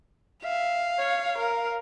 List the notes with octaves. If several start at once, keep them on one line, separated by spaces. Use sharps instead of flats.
E5 F5
C#5
A#4